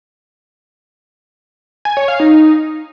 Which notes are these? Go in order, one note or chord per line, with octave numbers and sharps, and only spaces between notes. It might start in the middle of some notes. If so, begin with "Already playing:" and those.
G#5
C#5
F5
D#4